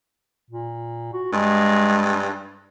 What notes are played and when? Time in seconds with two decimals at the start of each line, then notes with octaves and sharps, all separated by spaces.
0.51 A#2
1.13 F#4
1.33 G2 G#3